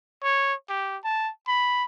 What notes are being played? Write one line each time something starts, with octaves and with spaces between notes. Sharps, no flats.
C#5
G4
A5
B5